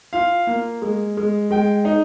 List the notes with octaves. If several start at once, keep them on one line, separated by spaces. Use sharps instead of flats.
F4 F5
A#3
G#3
G#3
G#3 G5
D#4